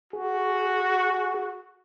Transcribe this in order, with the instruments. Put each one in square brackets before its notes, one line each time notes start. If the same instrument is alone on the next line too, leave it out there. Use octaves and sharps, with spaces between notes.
[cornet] F#4 [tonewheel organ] G#4